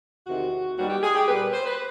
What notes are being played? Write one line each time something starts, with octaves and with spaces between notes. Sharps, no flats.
E2 C3 D#3 F#4
D#2 D#3 G3 B3 F#4
G4
G#4
G4
A#2 G3 B3 B4
C5
B4